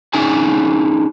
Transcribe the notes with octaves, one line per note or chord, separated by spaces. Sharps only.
C#4 D#4 E4 G#4 G#5 A5